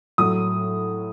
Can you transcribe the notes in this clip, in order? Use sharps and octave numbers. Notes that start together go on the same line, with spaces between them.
A2 F#3 D#6